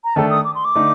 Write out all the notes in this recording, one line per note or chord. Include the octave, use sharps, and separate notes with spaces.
A#5
D#3 A3 D4 A4 A5
D#6
D6
C6
D6
D3 A3 D#4